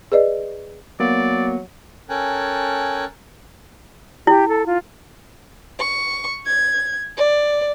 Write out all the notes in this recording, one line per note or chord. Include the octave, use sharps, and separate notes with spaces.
G#4 B4 D5 D#5
F#3 A#3 B3 D5
C#4 A4 A#4 G5 G#5 F#6
E4 G4
A4
F4
C#6
G#6
D5